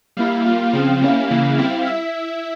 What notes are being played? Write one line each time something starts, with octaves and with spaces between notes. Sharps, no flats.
G3 A#3 E4 F5
G3 A#3 F4
C#3 F3 C4 F5
G3 A#3 C#4 E4
C#3 E3 A#3 E4
G3 C4 E4 F5
E4 E5